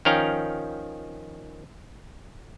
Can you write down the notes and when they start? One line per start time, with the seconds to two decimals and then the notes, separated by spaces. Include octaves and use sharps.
0.05 D#3 F3 C#4 F5 G5 A#5